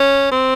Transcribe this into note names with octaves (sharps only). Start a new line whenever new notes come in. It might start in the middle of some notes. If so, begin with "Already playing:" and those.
Already playing: C#4
C4